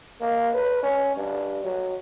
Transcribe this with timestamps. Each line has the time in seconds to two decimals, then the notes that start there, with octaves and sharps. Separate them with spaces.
0.20 A#3
0.54 B4
0.83 C#4
1.16 G2
1.64 F#3